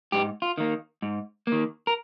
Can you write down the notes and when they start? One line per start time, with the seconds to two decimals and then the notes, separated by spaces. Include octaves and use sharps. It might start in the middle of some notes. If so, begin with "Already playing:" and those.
0.12 G#2 G4
0.42 F4
0.58 D#3 A#3
1.02 G#2
1.47 D#3 A#3
1.87 A#4